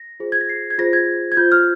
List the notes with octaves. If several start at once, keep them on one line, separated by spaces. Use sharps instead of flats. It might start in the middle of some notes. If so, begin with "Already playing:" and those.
Already playing: A#6
F4 G#4 C5
G#6
A#6
C7
G#6
F4 G#4 C5 A#6
G#6
G#6
F4 C5 G6
F6